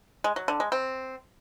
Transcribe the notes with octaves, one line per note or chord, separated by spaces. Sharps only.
G#3
F#3
D3
G#3
C4